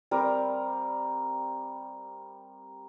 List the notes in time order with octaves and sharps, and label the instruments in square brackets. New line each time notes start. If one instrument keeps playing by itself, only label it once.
[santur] G3 C4 A#4